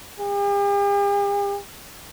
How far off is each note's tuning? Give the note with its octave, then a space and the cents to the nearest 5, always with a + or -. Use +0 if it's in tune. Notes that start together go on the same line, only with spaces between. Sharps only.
G4 +45